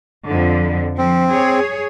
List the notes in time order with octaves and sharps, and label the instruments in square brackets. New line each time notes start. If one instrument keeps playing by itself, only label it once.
[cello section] F2 D3
[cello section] F3 [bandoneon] C4
[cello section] G#4 C#5